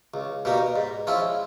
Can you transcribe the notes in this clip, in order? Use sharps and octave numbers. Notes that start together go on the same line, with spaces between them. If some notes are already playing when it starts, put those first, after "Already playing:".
C#2
B2 G3 A#3 D#4
G#2
F3 G#3 C#4 E4